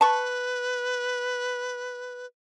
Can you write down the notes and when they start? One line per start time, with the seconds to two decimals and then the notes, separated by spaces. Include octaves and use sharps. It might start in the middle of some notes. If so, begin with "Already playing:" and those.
0.01 B4 A5 C#6